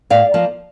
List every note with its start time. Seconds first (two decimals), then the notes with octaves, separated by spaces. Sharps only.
0.10 A2 D5 F5
0.34 F3 A#3